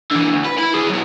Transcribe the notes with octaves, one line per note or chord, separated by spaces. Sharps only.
D3 E3
D2
B4
E4 B5
E4 G#4
F#3 B3